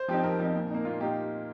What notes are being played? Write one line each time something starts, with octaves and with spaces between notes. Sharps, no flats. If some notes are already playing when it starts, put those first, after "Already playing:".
Already playing: C5
F3 C4 D#4 G4
F2 A#4
F3 C4 D#4
A#2
A#3 D#4
A#2 F4
A#3 D#4 G4